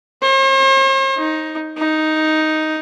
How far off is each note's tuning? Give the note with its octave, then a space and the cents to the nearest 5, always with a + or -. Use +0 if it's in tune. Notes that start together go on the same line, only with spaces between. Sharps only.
C5 +45
D#4 +10
D#4 +5